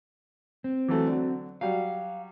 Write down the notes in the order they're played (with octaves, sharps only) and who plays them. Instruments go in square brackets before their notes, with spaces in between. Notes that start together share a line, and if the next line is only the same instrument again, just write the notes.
[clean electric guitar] C4
[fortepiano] E3 F#3 A3
D3 F#3
[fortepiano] F#3 G3 [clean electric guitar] F5